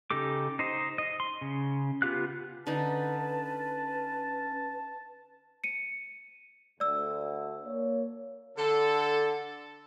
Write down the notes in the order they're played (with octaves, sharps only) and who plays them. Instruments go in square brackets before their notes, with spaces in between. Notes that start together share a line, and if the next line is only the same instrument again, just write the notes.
[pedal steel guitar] C#3 D#4 G4 A4 D6
D#4 C5 D#5
D#5
C6
C#3
B3 F4 G4 F5 F#6
[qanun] D3 D#4 [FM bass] C#4 [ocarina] B4 [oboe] A5
[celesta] C#7 D#7
[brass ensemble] D2 [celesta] D5 E6
[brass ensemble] A#3 C#5
[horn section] D3 A4